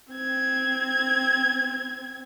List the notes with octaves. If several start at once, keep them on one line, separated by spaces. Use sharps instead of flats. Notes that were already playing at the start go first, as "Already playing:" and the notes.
C4 G#6